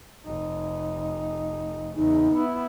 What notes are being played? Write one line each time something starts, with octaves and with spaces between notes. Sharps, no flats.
F1 D#4
E2 C#3 D#4
B3 E4